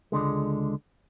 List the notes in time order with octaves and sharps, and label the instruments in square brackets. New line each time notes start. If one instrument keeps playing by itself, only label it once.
[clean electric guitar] C#2 D3 G#3